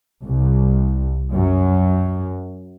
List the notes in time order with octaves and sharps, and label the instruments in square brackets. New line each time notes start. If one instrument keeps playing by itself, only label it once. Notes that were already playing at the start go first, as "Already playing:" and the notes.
[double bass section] C2
F#2